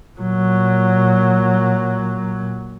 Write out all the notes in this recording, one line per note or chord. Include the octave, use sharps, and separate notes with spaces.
A#2 F#3